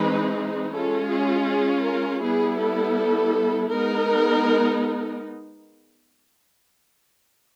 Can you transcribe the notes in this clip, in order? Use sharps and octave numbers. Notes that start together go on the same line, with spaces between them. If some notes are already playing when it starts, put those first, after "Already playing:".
Already playing: E3 G#3 C4 D#4 B4
G#3 C#4 F4 A4
G#4
G#4
A#4
G3 B3 E4 G#4
A4
G#3 B3 D#4 A#4